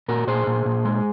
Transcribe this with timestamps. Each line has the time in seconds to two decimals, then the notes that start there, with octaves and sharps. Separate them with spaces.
0.08 A#2 F#4 A#4
0.27 A#2 G#4 C5
0.47 A#2
0.65 A#2
0.85 G#3